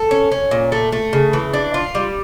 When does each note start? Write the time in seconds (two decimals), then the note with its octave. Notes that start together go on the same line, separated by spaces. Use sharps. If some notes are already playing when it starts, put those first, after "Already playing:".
Already playing: A4
0.11 C#4
0.32 C#4
0.51 A#2
0.72 A3
0.92 A3
1.13 C#3
1.33 E3
1.53 D4
1.74 F4
1.95 G3